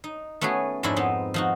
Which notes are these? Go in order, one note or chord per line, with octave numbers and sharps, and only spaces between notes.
D#4
A3 B3 C#4 F#4 G#4
F2 G#2 C#4 D4 E4 D5
B3 C4 D#4
F3 D#4 F#4